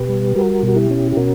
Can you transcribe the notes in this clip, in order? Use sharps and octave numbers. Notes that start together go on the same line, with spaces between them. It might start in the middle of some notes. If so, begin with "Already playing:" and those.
Already playing: B2 G4 B4
G3
G3 F#4 A#4
B2 F#4
E4 G4
C#4
G4
B2 F#4 A#4